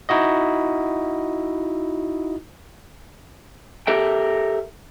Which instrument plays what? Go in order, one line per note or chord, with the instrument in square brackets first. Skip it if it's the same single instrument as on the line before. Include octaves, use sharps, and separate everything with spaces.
[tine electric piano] D#4 E4 F#4 D#5
[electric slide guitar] G4 A4 A#4 E5 G5